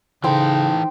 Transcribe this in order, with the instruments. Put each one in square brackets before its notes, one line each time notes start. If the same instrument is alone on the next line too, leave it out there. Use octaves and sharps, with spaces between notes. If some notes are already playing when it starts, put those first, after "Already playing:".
[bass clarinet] C#3 [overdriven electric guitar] E3 A4 [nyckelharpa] D#4 [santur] C5 G5 C6